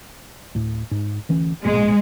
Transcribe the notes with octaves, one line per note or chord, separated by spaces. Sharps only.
D2 A2
G#2
D2 E3 C#4
A#1 G#2 B2 G#3